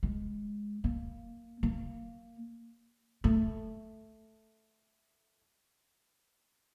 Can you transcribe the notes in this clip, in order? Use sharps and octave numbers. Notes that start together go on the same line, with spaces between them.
G#3
A#3
A#3
A3